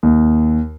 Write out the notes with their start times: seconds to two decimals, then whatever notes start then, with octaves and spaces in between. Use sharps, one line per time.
0.03 D#2